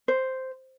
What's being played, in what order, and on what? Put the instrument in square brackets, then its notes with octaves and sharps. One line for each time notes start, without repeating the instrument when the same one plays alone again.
[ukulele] C5